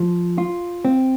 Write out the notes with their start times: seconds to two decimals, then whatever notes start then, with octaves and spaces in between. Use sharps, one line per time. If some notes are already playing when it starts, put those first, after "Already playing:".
Already playing: F3
0.38 F4
0.85 C4